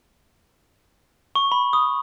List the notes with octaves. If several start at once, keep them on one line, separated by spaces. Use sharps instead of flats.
C#6
B5
D#6